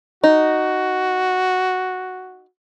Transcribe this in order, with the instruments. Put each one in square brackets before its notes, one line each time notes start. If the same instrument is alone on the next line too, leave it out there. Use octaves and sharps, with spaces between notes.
[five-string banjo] D#4 [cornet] F#4